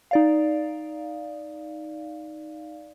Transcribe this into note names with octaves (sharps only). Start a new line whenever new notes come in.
D#4 D5 F5